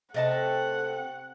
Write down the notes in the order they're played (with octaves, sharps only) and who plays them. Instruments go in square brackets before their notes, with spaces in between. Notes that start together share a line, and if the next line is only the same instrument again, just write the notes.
[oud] C3 [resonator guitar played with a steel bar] A3 D#5 A5 [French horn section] A4 [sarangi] F#5